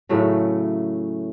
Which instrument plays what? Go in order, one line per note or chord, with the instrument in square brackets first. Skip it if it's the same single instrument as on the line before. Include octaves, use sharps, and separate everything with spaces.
[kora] A2 C#3 F#3 A3